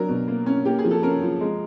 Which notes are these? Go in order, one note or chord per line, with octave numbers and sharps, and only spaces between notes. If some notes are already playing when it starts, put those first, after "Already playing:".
Already playing: F#3 D4 A#4
B2
A#3
C#4
A#3 G4
G#4
F3
A4
C#4 A#4
F3
G#3